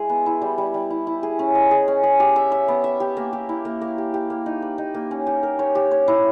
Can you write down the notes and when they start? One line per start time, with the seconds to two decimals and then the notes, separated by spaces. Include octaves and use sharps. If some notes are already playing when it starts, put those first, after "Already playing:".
Already playing: G#3 E4 G#4
0.09 B3
0.26 E4
0.42 G3
0.58 G3
0.74 G3
0.90 E4
1.07 E4
1.23 G#4
1.39 C#4
1.55 D#5
1.71 G#4
1.88 C#4
2.03 G#4
2.20 G4
2.36 E5
2.52 E5
2.68 B3
2.84 E5
3.00 G4
3.17 A#3
3.33 G4
3.49 E4
3.65 A#3
3.81 A#3
3.98 G4
4.14 G4
4.30 A#3
4.46 D#4
4.62 B4
4.78 D#4
4.94 A#3
5.11 C#4
5.27 G4
5.43 A#4
5.59 C#5
5.75 G4
5.91 C#5
6.08 E4